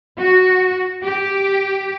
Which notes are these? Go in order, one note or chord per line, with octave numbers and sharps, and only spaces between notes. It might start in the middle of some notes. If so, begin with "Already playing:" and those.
F#4
G4